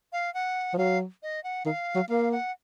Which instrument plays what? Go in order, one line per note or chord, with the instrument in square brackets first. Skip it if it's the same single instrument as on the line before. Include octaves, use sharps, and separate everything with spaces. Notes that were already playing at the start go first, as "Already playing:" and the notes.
[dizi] F5
F#5
[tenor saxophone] F3
[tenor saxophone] F#3 [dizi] F5
[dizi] D#5
F#5
[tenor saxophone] D#3 [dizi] F5
[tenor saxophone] F#3
[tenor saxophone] A#3 [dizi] F5
[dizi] F#5